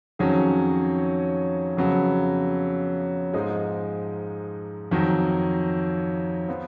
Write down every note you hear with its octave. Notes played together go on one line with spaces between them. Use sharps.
F2 D#3 F#3 C#4 G#4
F2 C#3 F#3 B3
G#2 F3 G#3 D#4
F2 D#3 F#3
F3 B3